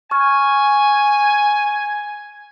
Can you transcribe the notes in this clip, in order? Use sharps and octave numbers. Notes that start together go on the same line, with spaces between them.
G#5 C#6 F6